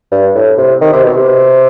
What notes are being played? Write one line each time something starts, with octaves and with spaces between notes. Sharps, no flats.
G2
A2
C3
D#3
C3
B2
C3